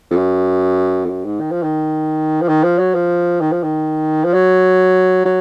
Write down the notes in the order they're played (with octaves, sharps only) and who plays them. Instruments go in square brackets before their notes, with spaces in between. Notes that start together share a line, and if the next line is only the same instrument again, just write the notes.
[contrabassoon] F2
F#2
F2
F#2
G#2
D#3
F3
D#3
F3
D#3
F3
F#3
F3
D#3
F3
D#3
F3
F#3
F#3